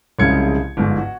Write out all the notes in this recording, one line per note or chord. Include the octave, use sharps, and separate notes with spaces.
C2 C#3 F3 G#3 G#6 C#7
G1 G#2 F3
F#4